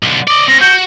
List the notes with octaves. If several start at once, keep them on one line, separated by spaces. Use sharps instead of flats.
B1 D3
D5 D#5 D6
C4 C#4 A#6
F#4 G6